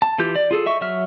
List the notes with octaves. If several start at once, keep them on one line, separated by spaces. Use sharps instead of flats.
A5
E3 F4 G4 G6
D5
F4 G#4 A4
D#5 E5 C#6
F#3 E5 F6